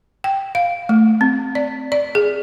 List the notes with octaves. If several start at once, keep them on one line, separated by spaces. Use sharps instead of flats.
G5
F5
A3
C4
D5
D5
G#4